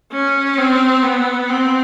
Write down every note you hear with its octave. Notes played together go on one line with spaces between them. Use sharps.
C#4
C4
B3
C4